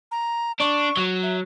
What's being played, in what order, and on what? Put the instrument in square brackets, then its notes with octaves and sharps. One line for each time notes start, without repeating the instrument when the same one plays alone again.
[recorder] A#5
[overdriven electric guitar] D4 [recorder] C#6
[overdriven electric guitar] F#3
[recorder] E5